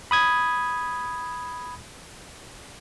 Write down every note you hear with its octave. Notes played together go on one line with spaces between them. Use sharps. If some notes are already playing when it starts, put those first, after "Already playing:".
B5 D#6 G#6